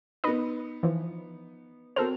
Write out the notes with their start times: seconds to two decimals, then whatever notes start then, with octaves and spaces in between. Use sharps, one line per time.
0.24 B3 D#4 B4 D#5
0.83 E3 F3
1.96 C4 F#4 A4 A#4 C5 F7